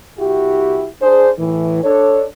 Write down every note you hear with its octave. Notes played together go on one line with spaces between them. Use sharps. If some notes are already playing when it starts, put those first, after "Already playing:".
C2 E4 F#4 G4
D4 G#4 C5
A2 E3
D4 A4 C#5